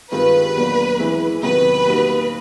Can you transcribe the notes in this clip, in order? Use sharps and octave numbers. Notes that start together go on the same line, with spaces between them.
G2 D#3 G#3 C4 F4 B4
E2 B2 F#3 A#3 D4
E3 G#3 C4 E4
E2 C3 D#3 F#3 B4
A#2 G3 A#3 D#4 F#4